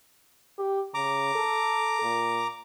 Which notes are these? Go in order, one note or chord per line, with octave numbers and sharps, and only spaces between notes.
G4
C#3 A#5 D6
A4
A#2